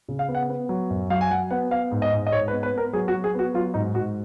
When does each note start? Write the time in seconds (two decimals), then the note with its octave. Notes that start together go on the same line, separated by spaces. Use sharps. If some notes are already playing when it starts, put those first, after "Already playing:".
0.09 C#3
0.19 F5
0.28 B3
0.35 F#5
0.49 B3
0.69 F#3
0.90 F#2
1.10 F#3 F5
1.21 G#5
1.31 F#3 F#5
1.51 B3 F#5
1.71 B3 F5
1.92 G#2
2.02 D#5
2.13 G#2
2.27 D#5
2.32 G#2 C#5
2.48 B4
2.52 B3
2.63 B4
2.73 B3 A#4
2.93 F#3 G#4
3.08 F#4
3.14 F#3
3.24 G#4
3.34 B3 F#4
3.54 F#3 F4
3.74 G#2 D#4
3.94 G#2 F#4